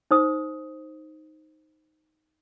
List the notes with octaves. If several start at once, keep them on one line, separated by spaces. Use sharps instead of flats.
D#4 C5 D#6